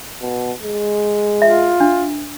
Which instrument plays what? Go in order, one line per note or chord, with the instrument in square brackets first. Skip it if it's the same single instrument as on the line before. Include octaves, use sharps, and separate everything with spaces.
[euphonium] B2
G#3
[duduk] F4 [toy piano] E5
[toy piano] D4